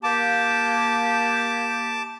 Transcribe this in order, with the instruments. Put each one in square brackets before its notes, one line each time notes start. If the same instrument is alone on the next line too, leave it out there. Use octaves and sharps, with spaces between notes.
[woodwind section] A#3 G4 [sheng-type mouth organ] A5 D6